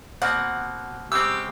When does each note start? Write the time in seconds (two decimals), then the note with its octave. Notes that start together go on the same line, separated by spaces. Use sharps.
0.22 B2 A#3 C4 F#5
1.12 C#3 G#3 C4 G4 E6